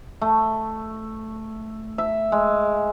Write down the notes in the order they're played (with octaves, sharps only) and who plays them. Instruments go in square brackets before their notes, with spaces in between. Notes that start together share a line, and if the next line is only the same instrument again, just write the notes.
[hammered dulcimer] A3
E5
G#3